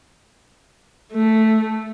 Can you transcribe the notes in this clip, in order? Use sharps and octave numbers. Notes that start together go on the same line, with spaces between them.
A3